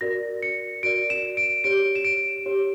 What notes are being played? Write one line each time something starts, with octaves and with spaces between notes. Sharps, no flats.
F#4 A#4 D5 A#6
C#7
F#4 A#4 D5 D7
E7
D7
G4 C#5 D7
E7
D7
G4 C#5